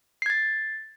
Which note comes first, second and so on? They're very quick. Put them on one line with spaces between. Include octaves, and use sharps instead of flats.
C7 G#6 A6